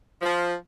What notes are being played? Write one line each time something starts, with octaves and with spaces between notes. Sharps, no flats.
F3